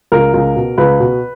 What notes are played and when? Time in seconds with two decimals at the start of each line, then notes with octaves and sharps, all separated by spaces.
0.12 C#2 A#4
0.34 C#2
0.56 B2
0.78 C#2 B4
1.00 B2